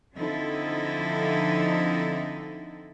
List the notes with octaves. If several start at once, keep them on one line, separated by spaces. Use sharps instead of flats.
D3 F3 C4 D#4 E4 A4